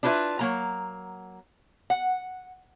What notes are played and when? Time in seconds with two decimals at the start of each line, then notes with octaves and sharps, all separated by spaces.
0.03 D4 E4 F4 A4 B4 E5
0.39 F#3 A#3 A#5
1.90 F#5